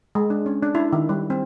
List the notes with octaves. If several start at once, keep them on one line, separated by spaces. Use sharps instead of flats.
G#3
D4
C#4
D4
E4
D#3
G3
C4